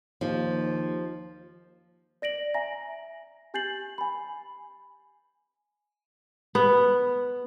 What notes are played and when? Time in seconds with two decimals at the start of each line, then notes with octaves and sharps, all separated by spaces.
0.21 D#2 F3
2.22 D5 A#6 D7 F#7
2.54 E5 G#5 A#5 A#6
3.54 G4 G#5 G6 A6 C7 F#7
3.98 G#5 B5
6.55 B3